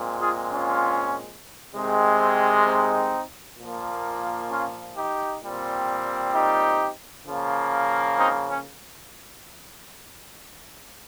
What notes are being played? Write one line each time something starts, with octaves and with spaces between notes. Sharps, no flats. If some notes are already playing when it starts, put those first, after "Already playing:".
Already playing: A#2 G#3 C4
F4 G#4
C#4 F4
C3 D#3 G#3 C4
C4 D#4
A#2 F3 A#3
C#4 F4
D#4 G4
A#2 G3 C4
D#4 G4
C#3 F3 A#3
C4 D#4
C#4